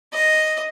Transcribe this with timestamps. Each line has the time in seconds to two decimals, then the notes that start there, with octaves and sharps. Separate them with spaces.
0.13 D#5